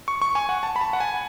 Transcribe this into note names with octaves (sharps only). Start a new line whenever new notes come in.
C#6
C#6
G#5
F#5
A5
B5
A5
F#5
G#5